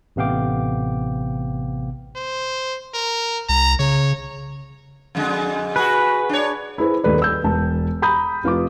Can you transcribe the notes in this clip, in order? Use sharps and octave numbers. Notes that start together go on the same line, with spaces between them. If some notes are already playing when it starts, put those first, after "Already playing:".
A1 C3 B3 F5 G5 D6
C5
A#4
C2 A#5
C#3 C#5
F2 D3 G#3
F#4 G#4 B4
D4 C#5
E4 G#4 B4 C5
D#1 D#3 A4 B4 D5
E6 G6
E1 A5
A#5 B5 D#6 G6
F1 F4 B4 D6